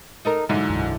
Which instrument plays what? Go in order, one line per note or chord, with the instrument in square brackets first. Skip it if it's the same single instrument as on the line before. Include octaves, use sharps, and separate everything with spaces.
[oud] D#4 A4 A#4
[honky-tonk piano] G#2 [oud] D3 E3 F#3
[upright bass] B1 F#2